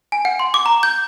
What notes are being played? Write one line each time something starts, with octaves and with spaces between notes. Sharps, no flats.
G#5
F#5
C6
D6
A#5
G6